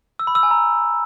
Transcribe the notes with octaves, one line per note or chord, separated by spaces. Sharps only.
E6
B5
E6
G#5
A#5